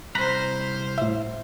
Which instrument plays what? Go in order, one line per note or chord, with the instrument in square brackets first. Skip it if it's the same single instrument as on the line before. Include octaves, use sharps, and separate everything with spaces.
[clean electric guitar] C2 A#5 B5 [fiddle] C5 F6 [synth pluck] F#6
[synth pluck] A2 E5